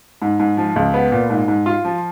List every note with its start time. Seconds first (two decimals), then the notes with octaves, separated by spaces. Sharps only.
0.22 G#2
0.40 G#2
0.57 F3
0.76 C#2
0.94 B3
1.12 A#2
1.30 G#2
1.48 G#2
1.66 F4
1.84 F3